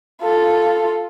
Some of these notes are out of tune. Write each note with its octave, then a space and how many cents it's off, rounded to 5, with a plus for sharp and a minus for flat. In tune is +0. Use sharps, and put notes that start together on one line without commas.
F4 +0 A4 +0